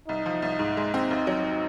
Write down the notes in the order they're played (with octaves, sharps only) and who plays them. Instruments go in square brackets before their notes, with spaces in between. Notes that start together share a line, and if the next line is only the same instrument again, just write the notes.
[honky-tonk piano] C2 [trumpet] D#4
[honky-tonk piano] F3
C2
G#2
G#3
C4
D#2
F#3